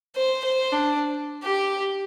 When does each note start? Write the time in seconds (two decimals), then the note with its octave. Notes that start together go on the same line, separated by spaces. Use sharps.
0.16 C5
0.44 C5
0.72 D4
1.43 G4